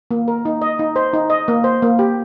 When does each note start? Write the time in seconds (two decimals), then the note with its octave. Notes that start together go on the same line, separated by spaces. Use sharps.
0.11 A#3
0.28 A#4
0.45 D#4
0.62 D#5
0.79 D#4
0.96 C5
1.14 D#4
1.30 D#5
1.48 A#3
1.64 C5
1.82 A#3
1.99 G4